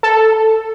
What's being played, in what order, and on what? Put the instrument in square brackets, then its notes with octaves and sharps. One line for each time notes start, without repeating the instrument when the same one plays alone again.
[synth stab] A4